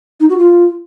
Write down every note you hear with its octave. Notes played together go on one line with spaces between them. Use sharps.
D#4
F#4
F4